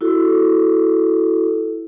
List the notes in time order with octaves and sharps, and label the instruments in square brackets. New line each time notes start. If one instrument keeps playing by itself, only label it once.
[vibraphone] E4 F#4 A4